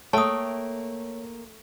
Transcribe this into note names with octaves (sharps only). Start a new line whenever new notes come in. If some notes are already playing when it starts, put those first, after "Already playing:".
A3 A#3 C#5 G5 A5 D#6